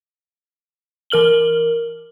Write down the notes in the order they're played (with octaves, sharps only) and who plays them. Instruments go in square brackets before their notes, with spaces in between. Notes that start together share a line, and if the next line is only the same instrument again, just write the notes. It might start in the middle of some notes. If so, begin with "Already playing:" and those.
[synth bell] E3 A#4 F6 F#7 G7